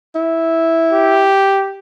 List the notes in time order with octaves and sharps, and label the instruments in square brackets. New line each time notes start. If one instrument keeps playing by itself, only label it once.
[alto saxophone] E4
[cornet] G4